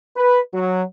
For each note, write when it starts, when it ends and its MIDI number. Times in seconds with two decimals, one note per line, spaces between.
0.16 0.40 71
0.52 0.82 54